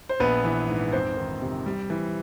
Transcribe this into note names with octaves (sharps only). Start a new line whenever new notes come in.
C5
A#1 B3 B4
E3
G#2
F2 C4 C5
D#3
C3
G3
E3